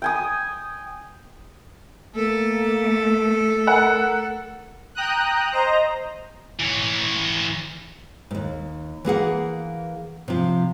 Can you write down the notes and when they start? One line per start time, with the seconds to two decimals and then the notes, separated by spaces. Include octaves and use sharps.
0.02 G5 G#5 D#6
2.15 A3 A#3 A4
3.67 A#4 F#5
4.95 G5 A#5 D#6 F#6
5.52 C5 D#5 A#5
6.60 E3 C#5
8.31 D#2 G#2
9.05 E3 A#3 G#4 F#5
10.28 C3 F3